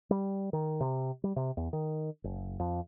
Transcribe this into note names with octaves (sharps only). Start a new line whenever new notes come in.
G3
D#3
C3
G3
C3
E2
D#3
F#1
F2